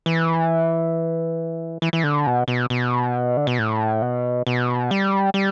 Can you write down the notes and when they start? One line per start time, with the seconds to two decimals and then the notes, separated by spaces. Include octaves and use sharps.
0.06 E3
1.82 E3
1.93 E3
2.04 D3
2.27 B2
2.48 B2
2.70 B2
3.37 D3
3.47 B2
3.59 A2
4.02 B2
4.47 B2
4.91 G3
5.34 G3